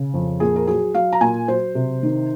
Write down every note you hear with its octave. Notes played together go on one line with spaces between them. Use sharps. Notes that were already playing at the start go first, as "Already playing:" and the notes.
Already playing: C#3
F2
A#2 G#4
A#4
F#3 G#4
F#3 F5
A#5
A#2 G#5
F#3 C5
C3
D#3